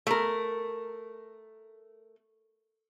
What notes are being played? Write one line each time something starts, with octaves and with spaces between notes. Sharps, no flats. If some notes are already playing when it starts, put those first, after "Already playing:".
A3 A#4